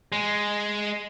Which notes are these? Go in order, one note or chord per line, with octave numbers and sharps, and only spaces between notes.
G#3